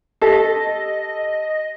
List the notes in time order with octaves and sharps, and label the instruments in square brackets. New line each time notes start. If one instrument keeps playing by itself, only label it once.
[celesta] G4 B6 [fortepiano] A4 [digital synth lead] D#5